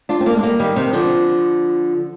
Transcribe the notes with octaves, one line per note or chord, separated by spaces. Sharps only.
D4 F4
C4
A#3 D4
G#3
G3 A#3
D#3 G3
C3 D#3
D3 F3